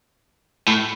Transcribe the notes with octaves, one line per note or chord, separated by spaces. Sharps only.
A2